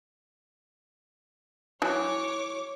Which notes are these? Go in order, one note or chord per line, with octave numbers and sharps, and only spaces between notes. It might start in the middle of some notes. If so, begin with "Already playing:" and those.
E3 F#3 C#5 D6